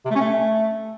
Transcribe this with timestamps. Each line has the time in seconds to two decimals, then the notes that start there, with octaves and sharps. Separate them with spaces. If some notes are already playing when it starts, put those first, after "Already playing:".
0.05 C3
0.10 A3
0.15 C#4
0.21 A3